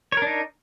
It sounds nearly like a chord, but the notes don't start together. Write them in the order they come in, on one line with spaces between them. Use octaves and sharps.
C#5 A#4 D4 D#4